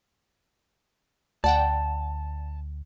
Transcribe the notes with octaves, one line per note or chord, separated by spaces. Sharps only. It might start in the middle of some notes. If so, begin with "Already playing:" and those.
D2 D5 F#5 G5 A5